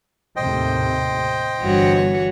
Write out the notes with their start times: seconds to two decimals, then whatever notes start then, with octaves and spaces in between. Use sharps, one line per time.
0.36 D#2 A2 C3 C5 D#5 G5
1.60 G1 G2 E3 F#4 C#5